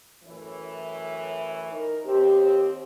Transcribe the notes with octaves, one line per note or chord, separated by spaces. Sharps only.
F#2 A2 E3
D#4 A#4
D#2 C4 G4